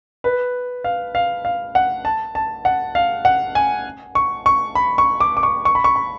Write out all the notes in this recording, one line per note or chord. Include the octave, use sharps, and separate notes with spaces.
B4
F5
F5
F5
F#5
A5
A5
F#5
F5
F#5
G#5
C#6
C#6
B5
C#6
D6
D6
C#6
C#6
B5
C#6
B5